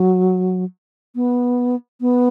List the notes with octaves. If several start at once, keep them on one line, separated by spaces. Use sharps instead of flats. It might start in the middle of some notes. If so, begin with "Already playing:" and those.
Already playing: F#3
B3
B3